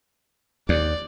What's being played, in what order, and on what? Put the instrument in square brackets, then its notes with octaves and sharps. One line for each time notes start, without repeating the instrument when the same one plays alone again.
[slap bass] D#2 [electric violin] D5